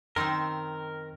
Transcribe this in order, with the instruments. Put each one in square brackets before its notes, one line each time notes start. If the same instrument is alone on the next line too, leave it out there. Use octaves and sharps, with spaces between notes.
[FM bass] F#2 [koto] D#3 C4 [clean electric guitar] A#4 [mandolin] D#5 C6 E6